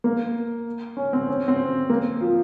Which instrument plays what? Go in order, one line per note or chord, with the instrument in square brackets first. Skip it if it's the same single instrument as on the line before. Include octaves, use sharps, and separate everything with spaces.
[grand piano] A#3
C#4
C4
C#4
C#4
C4
A#3
F3